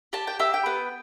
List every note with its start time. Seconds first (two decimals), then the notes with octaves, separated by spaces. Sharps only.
0.13 G4 A5
0.27 G5
0.39 G4 E5
0.54 G5
0.66 B3